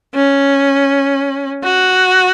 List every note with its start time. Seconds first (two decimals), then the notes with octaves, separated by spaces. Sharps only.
0.14 C#4
1.63 F#4